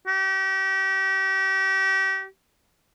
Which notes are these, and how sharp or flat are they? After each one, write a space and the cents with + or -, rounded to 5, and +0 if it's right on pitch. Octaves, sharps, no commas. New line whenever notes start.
G4 -35